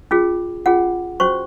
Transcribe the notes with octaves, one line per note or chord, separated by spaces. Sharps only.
C#4 F4 G#4
C#4 F4 G#4 F#5
C#4 F#4 C5 C#6